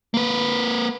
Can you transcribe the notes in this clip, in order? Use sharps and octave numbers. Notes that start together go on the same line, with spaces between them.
A#3 B4